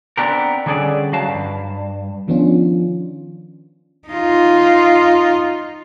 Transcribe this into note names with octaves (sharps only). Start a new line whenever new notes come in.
B3 C4 D4 G4 A#4
D3 G3 C#4 G#4 A4 D5
F#3 F#4 F5 A5
G2
D#3 F3 B3 C#4 D4 F4
D#4 F4